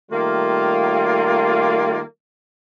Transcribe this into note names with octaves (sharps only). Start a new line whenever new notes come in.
D#3 G3 A3 A#3 F4